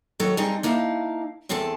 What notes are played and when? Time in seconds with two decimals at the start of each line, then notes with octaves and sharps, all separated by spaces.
0.20 D#3 F#3 A4 C#5
0.37 G3 C4 D#4 G#4 A4
0.63 A#3 D#4 E4 F5 A5
1.49 E2 C4 G#4 A4 A5